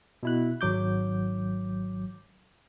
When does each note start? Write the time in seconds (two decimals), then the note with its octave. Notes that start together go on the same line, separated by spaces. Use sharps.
0.23 B2 E4 F#6
0.61 G#1 F#3 D6 G6